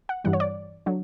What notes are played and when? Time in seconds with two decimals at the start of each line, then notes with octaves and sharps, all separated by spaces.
0.09 F#5
0.24 G2 E3 G3 F#5
0.33 C#5
0.40 D5
0.86 D3 F#3